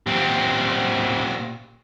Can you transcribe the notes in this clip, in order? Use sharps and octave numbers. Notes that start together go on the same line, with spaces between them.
A#2 F#3 C4 G4